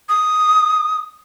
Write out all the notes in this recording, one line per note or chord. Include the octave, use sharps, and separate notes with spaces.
D#6